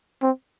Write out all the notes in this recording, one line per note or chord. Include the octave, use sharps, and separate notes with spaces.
C4